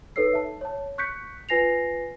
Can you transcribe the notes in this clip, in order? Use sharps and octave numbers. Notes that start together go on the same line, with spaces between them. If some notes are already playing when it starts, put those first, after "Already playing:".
D#4 A4 B4 C#5 E6 C7
E5 A5
C#5 A5
C#6 F#6 G6 B6 C#7
F4 B4 G#5 A#6 C7 F7